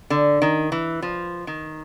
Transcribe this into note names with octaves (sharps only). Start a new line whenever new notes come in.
D3
D#3
E3
F3
D#3